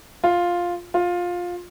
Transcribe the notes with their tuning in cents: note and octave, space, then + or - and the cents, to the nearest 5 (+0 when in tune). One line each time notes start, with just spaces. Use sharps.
F4 +5
F4 +15